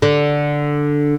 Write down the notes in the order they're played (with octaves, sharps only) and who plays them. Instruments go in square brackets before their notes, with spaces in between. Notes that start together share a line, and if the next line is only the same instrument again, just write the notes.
[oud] D3